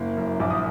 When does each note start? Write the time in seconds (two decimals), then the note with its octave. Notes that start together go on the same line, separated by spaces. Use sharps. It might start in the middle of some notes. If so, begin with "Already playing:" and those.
Already playing: F#1 A#3
0.17 F#2
0.40 A#1 D6
0.50 D#6